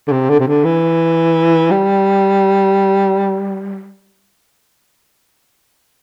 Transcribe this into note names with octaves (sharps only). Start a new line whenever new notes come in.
D3
C3
D3
C3
D3
E3
G3